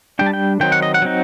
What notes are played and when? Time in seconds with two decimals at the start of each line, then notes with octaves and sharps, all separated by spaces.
0.19 G3 D4 G5
0.26 A5
0.33 G5
0.60 D#3 F#3 C4 D#4 G5
0.72 F#5
0.82 D#5
0.94 F#5
1.02 F#3 C4 D#4